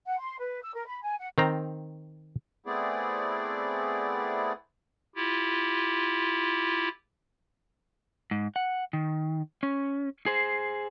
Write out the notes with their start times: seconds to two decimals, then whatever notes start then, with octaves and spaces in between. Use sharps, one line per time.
0.06 F#5
0.19 C6
0.39 B4
0.62 E6
0.74 A#4
0.86 B5
1.02 G#5
1.19 F#5
1.38 D#3 C4 A#5
2.66 A3 B3 C4 E4 G#4 D5
5.16 E4 F4 G4
8.31 G#2
8.56 F#5
8.93 D#3
9.63 C#4
10.26 G#4 C5